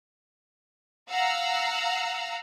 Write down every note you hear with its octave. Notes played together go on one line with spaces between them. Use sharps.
F5 F#5 A#5 E6